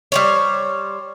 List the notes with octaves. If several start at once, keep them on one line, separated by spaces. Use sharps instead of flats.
G3 C5 C#5